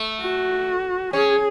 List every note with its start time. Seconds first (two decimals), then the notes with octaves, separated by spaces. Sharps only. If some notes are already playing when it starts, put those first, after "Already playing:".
Already playing: A3
0.21 F#4
1.13 C#4 G#4